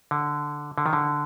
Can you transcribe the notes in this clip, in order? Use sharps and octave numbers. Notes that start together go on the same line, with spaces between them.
D3
D3
D#3
D3